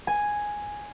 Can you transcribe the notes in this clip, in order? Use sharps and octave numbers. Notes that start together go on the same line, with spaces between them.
G#5